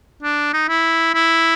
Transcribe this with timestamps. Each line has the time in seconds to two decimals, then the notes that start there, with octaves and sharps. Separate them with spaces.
0.23 D4
0.53 D#4
0.69 E4
1.14 E4